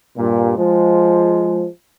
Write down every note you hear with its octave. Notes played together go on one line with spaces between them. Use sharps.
G2 A#2
F3 G#3